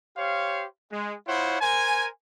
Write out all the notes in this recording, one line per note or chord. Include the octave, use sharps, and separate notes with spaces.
G4 C5 C#5 F5
G#3
E4 F4 C5 C#5 F#5
A#4 C5 G#5